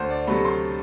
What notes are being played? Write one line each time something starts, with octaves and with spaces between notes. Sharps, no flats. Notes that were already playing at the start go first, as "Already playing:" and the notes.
Already playing: D2 C5
D5
C3 F#3 A3 B5
C6